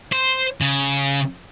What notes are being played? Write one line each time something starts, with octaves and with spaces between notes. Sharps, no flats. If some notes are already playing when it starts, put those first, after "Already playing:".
C5
C#3